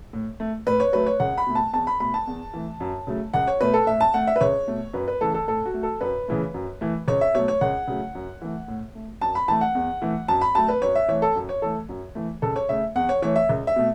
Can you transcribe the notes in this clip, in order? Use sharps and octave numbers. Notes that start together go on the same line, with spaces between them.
A2
A3
A2 B4
C#5
F#3 A3 B4
C#5
C#2 F#5
B5
B2 A3
A5
E2 A5
B5
B2 A3 B5
A5
E2
E3 A3
F#2
C#3 F#3 A3
C#2 F#5
C#5
B2 A3 B4
A4
A2 E5
A5
A3 F#5
E5
B4
C#2 C#5
B2 A3
F#2 B4
B4
C#3 E3 A3 A4
A4
A2 A4
F#4
A3
A4
F#2 B4
C#3 E3 A3
F#2
E3 A3
C#2 C#5
E5
B2 F#3 A3 C#5
C#5
C#2 F#5
C#3 F#3 A3
F#2
E3 A3
A2
A3
F#2 A5
B5
E3 A3 A5
F#5
E2
E3 A3
F#2 A5
B5
F#3 A3 A5
B4
F#2 C#5
E5
E3 A3 C#5
A4
F#2
C#5
E3 A3 A4
F#2
E3 A3
C#2 A4
C#5
C#3 A3 E5
E2 F#5
C#5
E3 A3 C#5
E5
C#2
E5
B2 A3